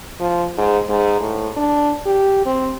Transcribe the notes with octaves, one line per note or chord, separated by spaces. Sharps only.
F3
G#2
G#2
A2
D4
G4
C4